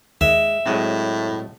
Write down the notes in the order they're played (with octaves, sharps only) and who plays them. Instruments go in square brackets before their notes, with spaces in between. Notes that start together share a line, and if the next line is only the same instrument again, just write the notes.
[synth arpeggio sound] D#2 [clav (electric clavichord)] G#3 [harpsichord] E5
[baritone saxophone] A2 [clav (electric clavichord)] F#3 G#3 C4